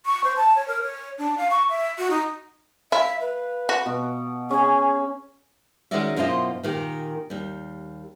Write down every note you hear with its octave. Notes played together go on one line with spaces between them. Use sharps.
C#6
C5
A5
C#5
A#4
C#5
D4
F5
C#6
E5
F#4
D#4
E4 E5 F5
B4
F#4
B2
C#4 G#4
D#3 G#3 C#4 F#4 D5 E5
F#2 B2 E4 F4 C5 D#5
A#2 D#3 G4
D#2 G3